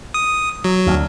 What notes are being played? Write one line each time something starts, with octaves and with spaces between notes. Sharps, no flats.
D#6
F#3
D2